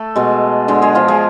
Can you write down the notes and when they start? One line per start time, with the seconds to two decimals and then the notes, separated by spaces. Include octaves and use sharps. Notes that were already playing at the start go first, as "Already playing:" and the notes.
Already playing: A3 A4
0.16 B2 G#3
0.68 D3 G#3
0.82 G#3 G#4
0.95 F3 F4
1.08 G#3 G#4